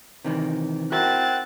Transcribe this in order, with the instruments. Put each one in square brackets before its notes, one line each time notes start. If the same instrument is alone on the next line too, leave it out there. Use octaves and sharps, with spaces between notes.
[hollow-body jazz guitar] C3 D#3 E3
[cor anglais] C4 [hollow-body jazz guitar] E4 F#4 A#4 [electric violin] F#6 A6